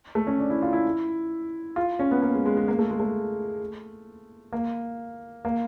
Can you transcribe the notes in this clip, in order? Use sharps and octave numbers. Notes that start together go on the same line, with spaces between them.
A3
C#4
D4
E4
F4
E4
F4
C#4
B3
A#3
G#3
G#3
G#3
A#3
A3
G#3
A3
A#3
A#3